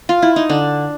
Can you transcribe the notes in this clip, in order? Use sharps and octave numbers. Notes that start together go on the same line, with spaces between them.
F4
E4
D#4
D3 D4